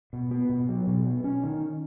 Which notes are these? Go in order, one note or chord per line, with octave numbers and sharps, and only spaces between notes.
B2
B3
B2
F#3
B2
B3
C#4
D#3